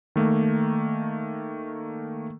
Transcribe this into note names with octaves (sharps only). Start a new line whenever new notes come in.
D#3 A3 A#3